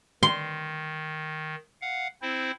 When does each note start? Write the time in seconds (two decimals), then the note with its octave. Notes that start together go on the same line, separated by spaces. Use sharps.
0.23 D#3 C6
1.82 F5 F#5
2.22 C4 E4 C5